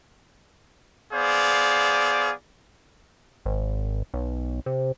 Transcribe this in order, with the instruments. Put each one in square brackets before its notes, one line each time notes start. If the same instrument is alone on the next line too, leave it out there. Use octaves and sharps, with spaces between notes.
[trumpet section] B3 G#4 C5 D5 F5
[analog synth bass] G#1
B1
C3